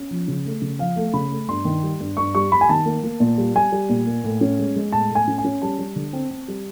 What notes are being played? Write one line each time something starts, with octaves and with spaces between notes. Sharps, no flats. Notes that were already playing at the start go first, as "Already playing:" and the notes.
Already playing: C#4
F3
C#3
A3
C#3
F3 F5
A3
C#3 B5
A3
G2 C6
D#3
G3
G2
G2 C#6
G3 C#6
G3 B5
G#5
D#3 A5
A#3
A#3
A#2
G3
G3 G#5
G3
A#2
A#3
A2
C#4
G#3
G#3
A2 A5
A2
G#5
C#4
G#5
C#4
G3 A5
G3
D3
C4
C4
G3